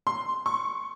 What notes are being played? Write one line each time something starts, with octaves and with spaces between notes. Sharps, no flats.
C6
C#6